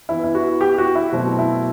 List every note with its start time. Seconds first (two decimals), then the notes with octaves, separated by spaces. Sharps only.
0.09 E3 B3 E4
0.24 E4
0.35 F#4
0.61 G4
0.78 F#4
0.95 E4
1.12 B2 F#3 A3 C4
1.39 E4